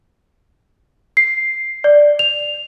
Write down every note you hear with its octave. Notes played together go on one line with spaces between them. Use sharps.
C7
D5
F7